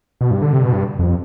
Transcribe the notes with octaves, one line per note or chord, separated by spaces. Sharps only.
B2
G2
D3
C3
B2
G2
F2